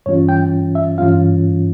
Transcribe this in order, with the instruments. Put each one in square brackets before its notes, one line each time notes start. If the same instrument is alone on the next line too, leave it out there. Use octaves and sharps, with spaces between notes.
[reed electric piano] G2 E3 G3 C#4 F4 C#5
G5
E5
G2 E3 G3 C#4 F4 F5